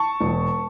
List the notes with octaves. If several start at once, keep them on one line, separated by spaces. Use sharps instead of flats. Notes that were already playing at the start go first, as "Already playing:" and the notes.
Already playing: A5 C#6
E1